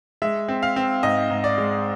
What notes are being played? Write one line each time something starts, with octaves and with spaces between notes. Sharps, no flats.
G#3 E5
C4
F5
C4
G#2 D#5
G#2
D5
G#3